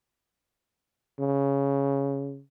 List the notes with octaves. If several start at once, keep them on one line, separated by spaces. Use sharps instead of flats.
C#3